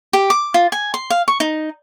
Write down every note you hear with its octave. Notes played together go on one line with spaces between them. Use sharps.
G4
D6
F4
G#5
C6
F5
C#6
D#4